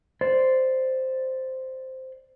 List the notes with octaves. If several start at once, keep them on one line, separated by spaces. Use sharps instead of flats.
C5 D5